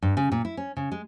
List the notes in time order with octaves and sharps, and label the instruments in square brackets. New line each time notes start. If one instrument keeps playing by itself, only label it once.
[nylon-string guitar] G2
C#3
A#2
E4
C#4
C#3
G#3